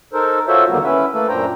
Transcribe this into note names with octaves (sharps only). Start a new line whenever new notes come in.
D#4 A4 A#4 C5
F4 F#4 A4 C5 C#5 E5
E2 D3 D#3 G3 A#3 B3
C#4 E4 B4 E5
A3 A#3 A4 B4
F#2 A#2 D4 C5 G5 A#5